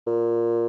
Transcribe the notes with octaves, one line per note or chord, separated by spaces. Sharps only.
A#2